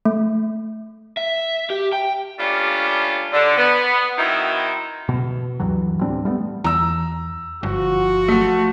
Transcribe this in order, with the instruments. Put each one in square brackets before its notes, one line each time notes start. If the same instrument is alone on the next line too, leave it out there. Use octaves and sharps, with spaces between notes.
[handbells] A3
[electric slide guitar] E5
G4
G5
[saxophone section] G3 A3 A#3 C#4 D4 F4
D3
B3
D#3 F#3 C4 D#4 E4
[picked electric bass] B2
D2 G2 E3 F#3
A2 G3 C4 D4
G3 A3 B3
[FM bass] E2 [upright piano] A#5 E6
[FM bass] G1 [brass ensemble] F3 F#4
[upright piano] A3